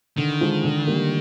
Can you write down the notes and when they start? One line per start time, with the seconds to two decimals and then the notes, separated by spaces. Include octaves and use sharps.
0.17 D3 D#3
0.41 F3 G#3
0.64 D3
0.87 G3 A#3